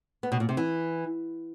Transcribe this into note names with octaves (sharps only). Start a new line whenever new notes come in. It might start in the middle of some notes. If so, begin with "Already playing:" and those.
B3
B2
A#2
C3
E3